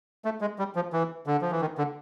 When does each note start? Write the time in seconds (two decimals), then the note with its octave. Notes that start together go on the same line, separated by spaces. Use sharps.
0.25 A3
0.41 G#3
0.59 G3
0.75 F3
0.93 E3
1.27 D3
1.41 F3
1.51 E3
1.61 D#3
1.78 D3